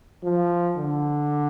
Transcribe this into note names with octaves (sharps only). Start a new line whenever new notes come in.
F3
D3